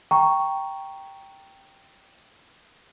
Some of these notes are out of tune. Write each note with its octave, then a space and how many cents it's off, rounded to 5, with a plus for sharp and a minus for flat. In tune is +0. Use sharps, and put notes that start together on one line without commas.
G5 +0 A#5 -5 C#6 +0